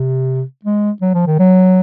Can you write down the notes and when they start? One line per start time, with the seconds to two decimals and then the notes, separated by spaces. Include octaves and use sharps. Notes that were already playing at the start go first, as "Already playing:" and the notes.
Already playing: C3
0.65 G#3
1.02 F#3
1.15 F3
1.27 D#3
1.39 F#3